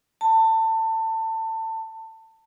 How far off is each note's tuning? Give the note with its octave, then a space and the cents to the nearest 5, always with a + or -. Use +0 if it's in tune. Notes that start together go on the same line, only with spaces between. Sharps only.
A5 +25